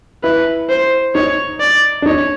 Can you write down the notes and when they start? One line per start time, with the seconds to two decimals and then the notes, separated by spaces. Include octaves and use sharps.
0.23 E4 B4
0.70 C5
1.15 D#4 C#5
1.60 D5
2.02 D4
2.06 D#4 C#5